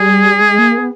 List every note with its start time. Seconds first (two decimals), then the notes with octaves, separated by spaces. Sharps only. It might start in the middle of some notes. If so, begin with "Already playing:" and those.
Already playing: G3 G#4
0.41 G#3
0.59 A#3
0.78 B3